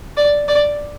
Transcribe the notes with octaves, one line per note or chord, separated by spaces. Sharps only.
D5
D5